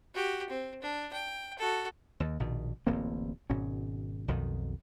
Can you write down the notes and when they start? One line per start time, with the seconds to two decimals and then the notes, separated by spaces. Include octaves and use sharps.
0.14 F#4 G4
0.49 C4
0.81 D4
1.13 G5
1.58 F#4 A4
2.20 D#2
2.40 A#1 B2 D#3
2.87 D1 A1 A#3 C4
3.50 G#1 B2 C#4
4.28 B1 F2 B2 D#3